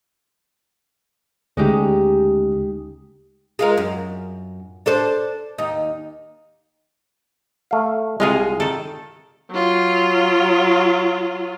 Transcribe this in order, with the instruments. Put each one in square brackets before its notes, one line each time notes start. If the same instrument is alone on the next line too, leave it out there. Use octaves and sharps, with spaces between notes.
[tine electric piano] D2 C#3 [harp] G#3 D#4 G4
[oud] G#3 F4 A#4
F#2
D4 A4 C5
D#2 D#4
[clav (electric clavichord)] A3 F5
[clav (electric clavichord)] C2 [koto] G#3 F4 G#4
[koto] D#3 A4
[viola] F#3 F4